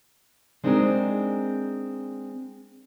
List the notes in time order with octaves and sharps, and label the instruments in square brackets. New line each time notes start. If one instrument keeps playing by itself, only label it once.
[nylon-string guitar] G#3 C4 D4 D#4 G#4 A#4